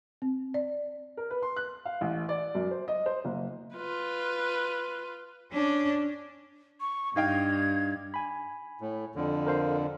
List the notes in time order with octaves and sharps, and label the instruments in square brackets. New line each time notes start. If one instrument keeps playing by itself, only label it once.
[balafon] C4
D5
[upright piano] A#4
B4
C6
F#6
F5
A1
D5
F#2
C5
D#5
C5
F#1
[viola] F4 B4
[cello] C#4 D4
[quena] C#6
[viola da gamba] G2 [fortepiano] D#4 F5 G5 [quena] G#6
[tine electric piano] G#5 B5
[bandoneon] A2
F2 D3
[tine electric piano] A#4 C5 F5